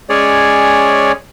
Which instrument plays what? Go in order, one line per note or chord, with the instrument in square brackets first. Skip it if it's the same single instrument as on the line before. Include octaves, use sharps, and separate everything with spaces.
[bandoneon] G#3 C#4 G#4 C#5 D5